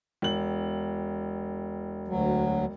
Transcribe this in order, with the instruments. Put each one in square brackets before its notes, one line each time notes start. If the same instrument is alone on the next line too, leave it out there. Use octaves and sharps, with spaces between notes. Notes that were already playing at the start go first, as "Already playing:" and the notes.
[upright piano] E1 F#7
[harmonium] D2 F#3